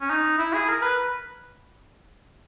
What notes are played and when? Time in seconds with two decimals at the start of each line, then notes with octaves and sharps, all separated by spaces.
0.01 C#4
0.10 D#4
0.39 E4
0.53 G#4
0.68 A#4
0.82 B4